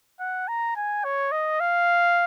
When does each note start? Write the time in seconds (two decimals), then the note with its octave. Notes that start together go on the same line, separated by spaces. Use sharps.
0.20 F#5
0.48 A#5
0.76 G#5
1.04 C#5
1.32 D#5
1.60 F5